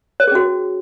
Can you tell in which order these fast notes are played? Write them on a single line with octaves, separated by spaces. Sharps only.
C#5 B4 G#4 C#4 F#4